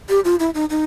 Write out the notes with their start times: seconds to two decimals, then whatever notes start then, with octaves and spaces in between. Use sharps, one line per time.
0.10 G4
0.25 F4
0.40 E4
0.55 D#4
0.70 D#4